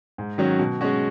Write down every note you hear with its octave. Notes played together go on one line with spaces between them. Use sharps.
G#2
D#3 F#3 C#4 F#4
B2
G#3 C#4 F#4